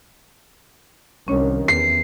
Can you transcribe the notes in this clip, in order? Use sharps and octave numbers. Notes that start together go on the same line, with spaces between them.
C2 D#3 C#4 D4 C#5
E2 C7